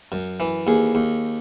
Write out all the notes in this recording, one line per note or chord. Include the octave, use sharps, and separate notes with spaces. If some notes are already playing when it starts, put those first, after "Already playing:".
F#2
E3
D#2 G#4
D#2